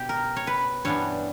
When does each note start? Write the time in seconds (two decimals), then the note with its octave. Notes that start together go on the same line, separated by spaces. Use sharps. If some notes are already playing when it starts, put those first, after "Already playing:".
Already playing: B2 G4
0.09 A#4
0.36 C#5
0.47 B4
0.85 G2 E3 B3 D4 C#5